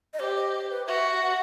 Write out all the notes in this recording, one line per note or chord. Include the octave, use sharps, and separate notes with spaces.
D#5
G4 C5
D#5
C5
B4
F#4 E5
F#5